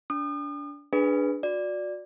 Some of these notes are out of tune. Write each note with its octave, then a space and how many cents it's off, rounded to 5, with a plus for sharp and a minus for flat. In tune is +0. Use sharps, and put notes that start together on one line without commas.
D4 -25 D#6 -40
D4 +0 G#4 +0 B4 +10
F#4 -30 D5 +0